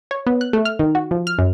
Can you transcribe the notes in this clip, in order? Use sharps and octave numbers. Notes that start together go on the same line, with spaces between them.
C#5
B3
F#6
A3
F6
D#3
F#4
F3
F6
F#2